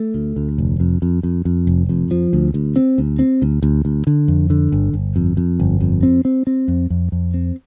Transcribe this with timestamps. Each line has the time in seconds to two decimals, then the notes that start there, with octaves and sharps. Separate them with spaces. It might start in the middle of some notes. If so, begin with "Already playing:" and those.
Already playing: A3
0.14 D2
0.36 D2
0.58 F1
0.80 F2
1.02 F2
1.23 F2
1.45 F2
1.67 F1
1.89 F2
2.11 F3
2.33 D2
2.54 D2
2.76 C4
2.98 D2
3.19 C4
3.42 D2
3.63 D2
3.85 D2
4.07 D3
4.28 F2
4.50 D3
4.72 G1
4.93 G1
5.16 F2
5.37 F2
5.60 G1
5.81 F2
6.03 C4
6.25 C4
6.47 C4
6.68 F2
6.90 F2
7.12 F2
7.34 C4